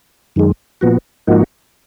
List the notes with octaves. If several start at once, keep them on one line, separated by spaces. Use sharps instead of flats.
F#2 D#3 G#3
A#2 F3 B3 F#4
G#2 F3 A#3 D#4 F#4